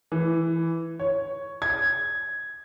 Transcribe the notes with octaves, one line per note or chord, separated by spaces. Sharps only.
E3
C#5
G#6